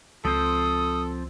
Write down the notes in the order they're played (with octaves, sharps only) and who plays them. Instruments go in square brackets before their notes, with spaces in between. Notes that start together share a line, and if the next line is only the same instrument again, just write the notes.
[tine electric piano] C#2 [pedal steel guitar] F3 C4 C5 [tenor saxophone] A4 [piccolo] D#6